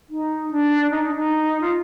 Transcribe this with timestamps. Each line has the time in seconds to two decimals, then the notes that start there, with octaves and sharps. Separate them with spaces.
0.10 D#4
0.51 D4
0.91 D#4
1.04 D4
1.15 D#4
1.61 F4